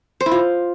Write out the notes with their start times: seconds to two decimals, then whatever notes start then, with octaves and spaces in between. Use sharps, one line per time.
0.21 C5
0.26 E4
0.31 F4